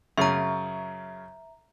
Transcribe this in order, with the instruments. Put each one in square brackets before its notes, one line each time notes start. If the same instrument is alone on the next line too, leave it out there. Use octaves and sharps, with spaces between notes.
[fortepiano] F#2 C#3 [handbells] E5 A#5